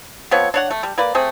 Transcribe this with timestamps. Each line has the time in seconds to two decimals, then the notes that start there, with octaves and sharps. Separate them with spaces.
0.31 F3 B3 C4 C#5
0.54 D4 C#5 F#5
0.71 A3
0.83 G3
0.98 A#3 B4 D5
1.15 A3 C4 G#4